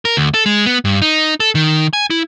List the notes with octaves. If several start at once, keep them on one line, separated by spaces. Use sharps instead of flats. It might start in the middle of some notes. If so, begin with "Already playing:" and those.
A#4
D2
A4
G#3
B3
G2
D#4
A4
D#3
G#5
E4